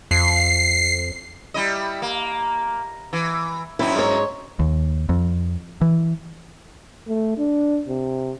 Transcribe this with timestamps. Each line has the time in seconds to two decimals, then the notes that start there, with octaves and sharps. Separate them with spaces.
0.11 F2 C7
1.54 G3 E4 D#5
2.02 A#3
3.13 E3
3.79 F#2 C4 D#4 E4
3.96 G#2 C#5
4.60 D#2
5.09 F2
5.81 E3
7.08 A3
7.38 D4
7.88 C3